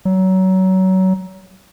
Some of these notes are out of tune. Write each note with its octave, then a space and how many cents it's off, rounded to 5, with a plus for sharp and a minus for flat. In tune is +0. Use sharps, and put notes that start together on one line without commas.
F#3 +25